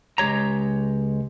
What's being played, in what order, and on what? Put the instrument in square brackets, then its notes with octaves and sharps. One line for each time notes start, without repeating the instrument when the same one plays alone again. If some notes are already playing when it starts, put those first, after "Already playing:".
[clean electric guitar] C#2 G#3 G4 C#5 A#5